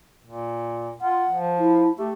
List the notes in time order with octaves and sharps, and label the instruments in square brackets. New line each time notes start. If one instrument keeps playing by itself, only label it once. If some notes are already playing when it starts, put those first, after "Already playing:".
[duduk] A#2
[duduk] F4 [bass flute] F#5
[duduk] F3
[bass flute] E4
[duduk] A3 [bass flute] G4